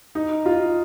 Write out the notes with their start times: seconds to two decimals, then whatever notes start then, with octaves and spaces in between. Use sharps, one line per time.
0.15 D#4
0.46 F4